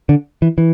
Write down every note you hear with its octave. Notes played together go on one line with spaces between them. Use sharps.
D3
E3
E3